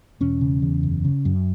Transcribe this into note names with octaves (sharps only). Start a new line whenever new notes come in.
E1 C#4
C#3
E2
F#1
C#3
F#2